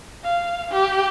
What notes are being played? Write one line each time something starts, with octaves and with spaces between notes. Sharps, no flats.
F5
G4